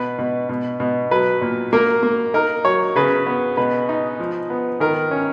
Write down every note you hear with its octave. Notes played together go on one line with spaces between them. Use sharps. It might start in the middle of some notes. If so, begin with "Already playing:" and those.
Already playing: B2 B4
B2
B2
B2
F#3 B4
A#2
A#3 A#4
A#3
D#4 A#4
F#3 C#5
C#3 B4
B3
B2 B4
D#4
F3
B3
D#3 A#4
C#4